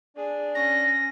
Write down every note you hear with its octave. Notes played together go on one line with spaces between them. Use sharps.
D4 G#4 D5
C#4 A#6